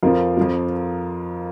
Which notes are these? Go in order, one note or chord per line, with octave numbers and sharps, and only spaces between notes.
F2 F3 F4 A#4
F2 F3